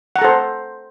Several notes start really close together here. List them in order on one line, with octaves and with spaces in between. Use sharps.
F#5 A#5 A4 C5